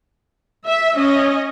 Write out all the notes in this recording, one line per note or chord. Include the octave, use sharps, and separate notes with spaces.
E5
C#4 D#5